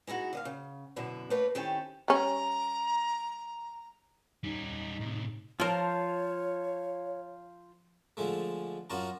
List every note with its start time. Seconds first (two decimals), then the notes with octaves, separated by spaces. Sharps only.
0.07 G#3 D#4 E4 F#4
0.33 D3 D#5 F5
0.45 C#3
0.96 F#2 B2 D3 E4
1.30 A3 A#3 B4 C#5
1.55 D#3 C4 C#4 E4 G4 A4
2.08 G3 C#4 A#5
4.44 G3 C#4 D#4
5.00 A2 C3
5.60 F3 F4 A#4 C5 C#5 A5
8.17 D3 F3 G#3 A3
8.90 F#2 F4 F#4 A5 A#5